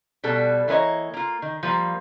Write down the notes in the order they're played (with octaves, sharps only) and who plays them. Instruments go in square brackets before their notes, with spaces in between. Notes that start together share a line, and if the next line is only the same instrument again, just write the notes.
[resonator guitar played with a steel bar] B2 G3 A4
E3 A#3 B4 C#5 D#5
A#3 F4
D#3
F3 G3 A#3